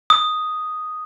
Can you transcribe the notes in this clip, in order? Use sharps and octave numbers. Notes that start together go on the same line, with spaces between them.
D#6